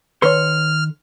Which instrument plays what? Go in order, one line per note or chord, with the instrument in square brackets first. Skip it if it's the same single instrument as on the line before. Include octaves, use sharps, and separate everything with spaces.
[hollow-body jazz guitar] D#3 A4 C6 [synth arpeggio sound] B4 C#5 [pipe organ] F6